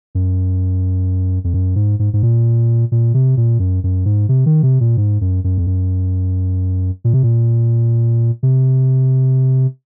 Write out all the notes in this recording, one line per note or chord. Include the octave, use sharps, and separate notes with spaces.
F#2
F2
F#2
G#2
G#2
G#2
A#2
A#2
C3
A#2
F#2
F#2
G#2
C3
D#3
C3
A#2
G#2
F#2
F#2
F2
F#2
A#2
C3
A#2
C3